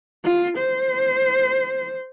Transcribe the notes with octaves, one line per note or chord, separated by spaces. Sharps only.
F4
C5